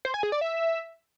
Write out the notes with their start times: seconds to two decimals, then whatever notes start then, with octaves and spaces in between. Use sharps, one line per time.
0.05 C5
0.14 G#5
0.23 G#4
0.32 D5
0.41 E5